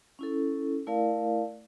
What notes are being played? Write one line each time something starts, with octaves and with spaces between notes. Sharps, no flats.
C#4 E4 A4
A3 E4 A#4 D5 F5